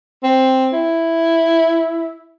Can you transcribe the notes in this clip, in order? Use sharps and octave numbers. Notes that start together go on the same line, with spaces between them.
C4
E4